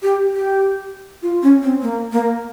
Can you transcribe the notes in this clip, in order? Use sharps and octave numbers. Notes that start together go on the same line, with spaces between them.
G4
G4
F4
C#4
C4
A#3
A#3